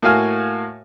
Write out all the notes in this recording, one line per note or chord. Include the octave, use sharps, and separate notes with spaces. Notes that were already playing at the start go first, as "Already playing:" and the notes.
A2 A#3 F#4 F5 G#5 F6